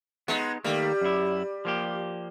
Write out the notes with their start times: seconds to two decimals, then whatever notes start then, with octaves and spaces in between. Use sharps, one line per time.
0.28 G#3 B3 D#4
0.64 D#3 G3 A3 A#3
1.01 F#2 E4
1.65 F3 A#3 G4